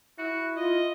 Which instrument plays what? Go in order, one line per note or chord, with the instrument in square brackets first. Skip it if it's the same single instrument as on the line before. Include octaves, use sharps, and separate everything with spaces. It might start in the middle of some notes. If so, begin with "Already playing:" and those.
[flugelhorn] E4 [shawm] F#4
[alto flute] F4 [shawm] D#5